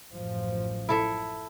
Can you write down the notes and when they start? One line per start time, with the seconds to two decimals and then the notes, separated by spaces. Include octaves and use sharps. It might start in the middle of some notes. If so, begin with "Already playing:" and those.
0.13 A1 F#2 F3
0.89 E4 A4 E5